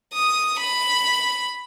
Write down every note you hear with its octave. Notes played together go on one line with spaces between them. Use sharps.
D#6
B5